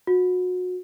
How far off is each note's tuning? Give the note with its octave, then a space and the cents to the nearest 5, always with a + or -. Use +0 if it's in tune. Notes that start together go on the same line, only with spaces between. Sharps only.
F#4 -30